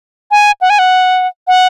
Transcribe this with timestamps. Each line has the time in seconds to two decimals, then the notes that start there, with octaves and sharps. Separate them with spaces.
0.31 G#5
0.61 F#5
0.70 G#5
0.79 F#5
1.47 F#5